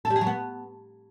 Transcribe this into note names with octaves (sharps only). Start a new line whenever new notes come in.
A4
G3
G#4
F#3
B3